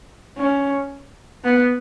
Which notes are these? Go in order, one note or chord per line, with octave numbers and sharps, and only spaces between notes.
C#4
B3